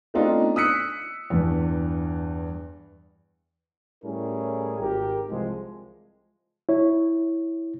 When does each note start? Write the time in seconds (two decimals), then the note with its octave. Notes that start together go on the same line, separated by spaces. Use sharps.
0.14 A3 B3 C4 D4 D#4 F4
0.56 D#6 E6 F#6 B6 C#7
1.30 E2 G2
4.04 A2 G3 C#4 E4 G#4 A#4
4.80 G#1 G4 A#4
5.29 C2 E3 F3 G#3
6.69 E4 C#5